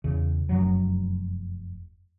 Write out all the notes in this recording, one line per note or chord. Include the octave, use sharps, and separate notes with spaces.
E2 C#3
F1 F#2 F#3